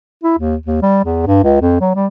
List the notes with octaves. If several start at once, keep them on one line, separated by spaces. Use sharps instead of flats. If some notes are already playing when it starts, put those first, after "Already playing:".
E4
D#2
D#2
G3
E2
G2
C#2
F2
F#3
G3